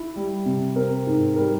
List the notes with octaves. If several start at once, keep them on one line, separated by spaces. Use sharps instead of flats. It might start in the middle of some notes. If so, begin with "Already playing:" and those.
Already playing: E4
G3
C3
C4 A#4
G#2
G3 A#4